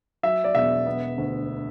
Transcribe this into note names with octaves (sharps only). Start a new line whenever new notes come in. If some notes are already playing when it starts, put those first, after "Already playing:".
F#3 E5
D5
E1 E5
B3
D2